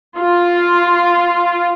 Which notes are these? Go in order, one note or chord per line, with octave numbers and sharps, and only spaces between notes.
F4